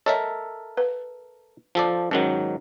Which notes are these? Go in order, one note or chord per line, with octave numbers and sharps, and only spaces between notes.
A4 A#4 C#5 D#5 E5
B4
F3 A4 D5
G#2 D#3 F#3 C#4 D#4 A#4